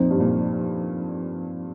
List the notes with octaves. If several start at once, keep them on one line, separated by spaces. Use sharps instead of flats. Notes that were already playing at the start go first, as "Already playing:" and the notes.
Already playing: F2 A#2 F3 C4 D#4 C5
G2
F2 A#2